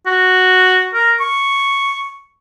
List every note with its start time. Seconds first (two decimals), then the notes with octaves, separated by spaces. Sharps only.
0.06 F#4
0.94 A#4
1.20 C#6